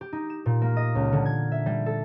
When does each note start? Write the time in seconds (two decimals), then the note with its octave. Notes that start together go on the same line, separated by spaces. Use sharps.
0.01 G4
0.13 D#4
0.30 E7
0.46 A#2
0.62 A#3
0.77 D#5
0.95 C#2
1.13 D3
1.25 G#6
1.52 E5
1.66 G3
1.86 A4